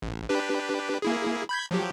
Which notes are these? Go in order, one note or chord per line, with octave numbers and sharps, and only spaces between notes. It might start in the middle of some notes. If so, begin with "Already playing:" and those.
A1
D4 G4 B4
A#3 E4 G#4
B5 G6 G#6
F3 F#3 G4